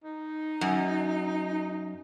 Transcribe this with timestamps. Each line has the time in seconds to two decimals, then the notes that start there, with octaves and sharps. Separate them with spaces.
0.04 D#4
0.61 F#2